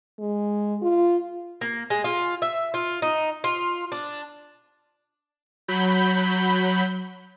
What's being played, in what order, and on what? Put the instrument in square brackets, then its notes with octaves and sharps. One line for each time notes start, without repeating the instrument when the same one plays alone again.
[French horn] G#3
F4
[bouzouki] A#3
G#3
F4
E5
F4
D#4
F4
D4
[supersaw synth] F#3 B5 G6